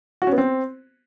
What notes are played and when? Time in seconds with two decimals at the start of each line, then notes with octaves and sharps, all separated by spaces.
0.22 F#4
0.27 C#4
0.32 B3
0.38 C4